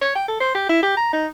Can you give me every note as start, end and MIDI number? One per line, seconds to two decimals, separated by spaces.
0.01 0.12 73
0.15 0.26 79
0.28 0.37 69
0.40 0.53 72
0.55 0.65 67
0.69 0.81 64
0.83 0.96 67
0.97 1.12 82
1.13 1.26 63